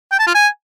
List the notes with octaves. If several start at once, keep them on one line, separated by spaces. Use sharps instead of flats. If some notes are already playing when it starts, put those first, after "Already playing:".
G5
A5
F4
G#5